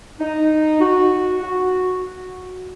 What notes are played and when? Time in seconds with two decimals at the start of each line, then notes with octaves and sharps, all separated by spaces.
0.20 D#4
0.80 F#4
1.42 F#4